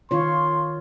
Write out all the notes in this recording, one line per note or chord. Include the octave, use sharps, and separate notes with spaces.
D#3 F4 C#5 C6